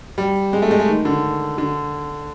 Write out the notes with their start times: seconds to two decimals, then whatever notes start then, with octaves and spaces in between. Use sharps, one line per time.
0.18 G3
0.53 G#3
0.62 A3
0.71 G#3
0.80 A3
0.88 D#3
1.05 D3
1.58 D3